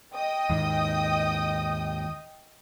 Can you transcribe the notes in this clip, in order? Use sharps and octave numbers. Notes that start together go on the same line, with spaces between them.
D#5 G5 D#6
D#2 G#2 D#3